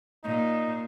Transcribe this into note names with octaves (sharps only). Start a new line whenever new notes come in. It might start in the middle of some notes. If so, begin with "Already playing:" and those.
A#2 D#4